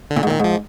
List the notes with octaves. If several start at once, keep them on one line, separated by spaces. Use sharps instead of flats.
D3
A#2
G#2
A#2 D#3
G#2 F3